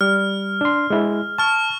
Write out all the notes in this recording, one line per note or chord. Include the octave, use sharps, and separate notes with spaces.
G3 F6
D4 C6
G#3 E4
A5 C#6 F6